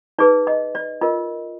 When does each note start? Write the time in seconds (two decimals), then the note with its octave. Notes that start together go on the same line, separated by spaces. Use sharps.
0.18 D#4 G#4 B4 D5
0.47 D#5
0.75 D5
1.01 F4 A#4 D#5